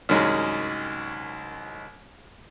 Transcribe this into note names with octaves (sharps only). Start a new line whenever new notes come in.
C2 F#2 D#3 F#3 G#3